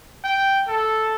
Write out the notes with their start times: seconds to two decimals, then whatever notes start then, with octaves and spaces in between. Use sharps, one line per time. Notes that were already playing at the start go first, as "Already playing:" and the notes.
0.24 G5
0.68 A4